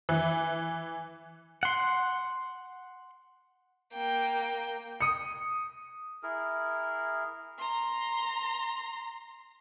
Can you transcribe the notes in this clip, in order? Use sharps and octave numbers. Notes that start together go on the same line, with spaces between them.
E3
F#5 C6
A#3 G5
D#6 C#7
E4 G#4 A#4
A#5 C6